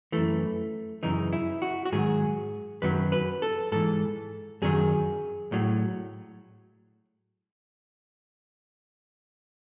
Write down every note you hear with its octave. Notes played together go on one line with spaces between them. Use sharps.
F#2 E3 A3
F#2 C#3 E3 D#4
E4
F#4
F#4
G#2 D#3 F#3 G#4
F#2 D#3 F#3 B4
B4
A4
G#2 E3 A4
F#2 D#3 F#3 G#4
A2 F#3